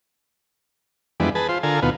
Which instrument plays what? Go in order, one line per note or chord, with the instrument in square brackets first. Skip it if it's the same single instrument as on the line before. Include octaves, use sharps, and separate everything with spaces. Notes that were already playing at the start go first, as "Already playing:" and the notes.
[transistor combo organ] F2 E3 G3 G#3 B3 D4
G#4 B4 A5
F4 C5
D3 F4 A4 A#4 G#5
D#2 B2 B3 F4